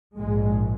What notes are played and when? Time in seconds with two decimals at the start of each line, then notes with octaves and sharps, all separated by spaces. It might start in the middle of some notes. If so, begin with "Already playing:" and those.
0.17 A#1 G#2 G#3